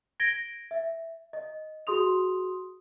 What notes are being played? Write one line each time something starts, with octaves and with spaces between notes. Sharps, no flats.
G#6 A#6 D7 G7
E5
D#5
F#4 G#4 C6 D#6 F7